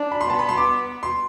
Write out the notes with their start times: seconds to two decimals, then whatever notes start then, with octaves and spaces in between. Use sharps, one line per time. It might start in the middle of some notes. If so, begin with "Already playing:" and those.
Already playing: D4
0.11 B5
0.21 C6
0.30 B3 A5
0.39 B5
0.49 C6
0.57 D6
1.03 C6